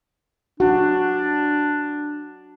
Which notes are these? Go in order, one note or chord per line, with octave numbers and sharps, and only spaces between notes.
D4 F#4